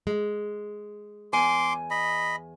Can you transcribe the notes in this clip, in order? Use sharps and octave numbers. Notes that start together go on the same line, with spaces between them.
G#3
E2 G#5 C6 D6
D#5 B5